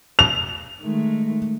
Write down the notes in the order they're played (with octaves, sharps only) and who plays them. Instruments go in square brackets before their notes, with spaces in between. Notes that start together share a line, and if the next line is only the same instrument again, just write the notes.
[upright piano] F7
[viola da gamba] D#3 G#3 A3